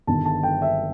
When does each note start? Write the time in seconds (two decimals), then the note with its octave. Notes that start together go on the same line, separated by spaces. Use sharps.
0.07 G1 G2 D#3 A5
0.25 A5
0.43 G5
0.62 E5